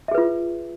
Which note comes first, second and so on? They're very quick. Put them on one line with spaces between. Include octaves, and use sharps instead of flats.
E5 G#4 B4 F4